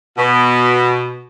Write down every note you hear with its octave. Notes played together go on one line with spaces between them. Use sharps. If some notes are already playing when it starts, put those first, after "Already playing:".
B2